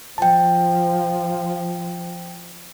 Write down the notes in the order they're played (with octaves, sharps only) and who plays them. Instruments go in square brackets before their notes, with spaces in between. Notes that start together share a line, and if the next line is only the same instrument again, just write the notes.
[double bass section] F3 [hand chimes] G5 A5